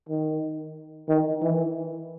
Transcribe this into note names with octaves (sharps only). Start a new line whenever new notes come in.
D#3
D#3
E3